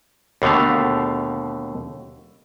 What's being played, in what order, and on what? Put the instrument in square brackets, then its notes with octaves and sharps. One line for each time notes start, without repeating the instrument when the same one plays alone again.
[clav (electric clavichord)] D#2 B2 D3 A3 F5